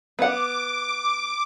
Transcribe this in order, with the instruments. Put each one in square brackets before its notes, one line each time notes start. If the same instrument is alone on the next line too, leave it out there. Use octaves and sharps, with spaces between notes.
[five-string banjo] B3 F#5 [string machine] D6